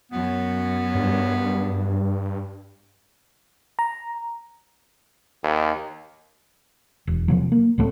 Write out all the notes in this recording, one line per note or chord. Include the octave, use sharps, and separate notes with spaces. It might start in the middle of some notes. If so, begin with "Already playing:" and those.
F#2 B3
G2
A#5
D#2
E1
C3 F3 F#3
A#3
C#2 A2 A3 C4